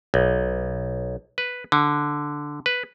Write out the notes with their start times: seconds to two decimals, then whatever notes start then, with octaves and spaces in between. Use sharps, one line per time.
0.14 B1
1.38 B4
1.72 D3
2.66 B4